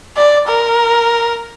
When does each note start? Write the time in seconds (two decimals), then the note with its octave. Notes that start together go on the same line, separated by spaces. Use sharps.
0.16 D5
0.47 A#4